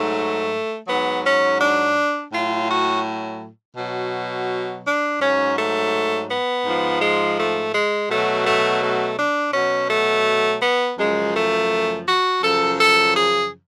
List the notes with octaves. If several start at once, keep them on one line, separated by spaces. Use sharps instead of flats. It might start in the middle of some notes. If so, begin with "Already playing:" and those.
Already playing: G#2 F#3 A3
G#2 F#3 B3
C#4
D4
A2 F#3 F4
F#4
B2 F#3
D4
G#2 F#3 C#4
A3
B3
G#2 F3
G#3
A3
G#3
B2 F#3 A3
A3
A3
D4
B2 F#3 C#4
A3
B3
F#2 C#3 F3 G#3
A3
F#4
F#2 C#3 F3 A4
A4
G#4